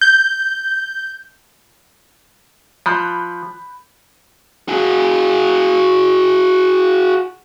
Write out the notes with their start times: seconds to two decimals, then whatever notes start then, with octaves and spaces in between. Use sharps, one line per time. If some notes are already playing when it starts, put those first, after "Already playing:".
0.01 G6
2.86 F3 B5 F#6 G6
4.68 F#4 G#4